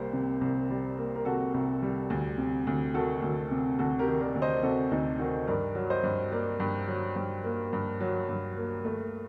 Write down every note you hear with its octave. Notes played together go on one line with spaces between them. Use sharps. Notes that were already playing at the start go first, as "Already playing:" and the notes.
Already playing: C2 G3 A#3 C5
C3
C2
G3
A#3
A#4
C3 F#4 A4
C2
G3
D2
C3
D2
D#3 F#4 A4
D2
C3
D2 F#4 A4
G4 A#4
D#3
A#4 D5
D2
C5 D#5
C3 F#4 A4
D2 D#4
D#3 F#4
G2 A#4 D5
F#3
C5 D#5
G2
A#3 A#4 D5
G2
F#3
G2
A#3
G2
F#3
G2
A#3
A3